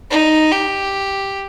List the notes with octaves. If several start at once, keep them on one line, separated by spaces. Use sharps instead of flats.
D#4
G4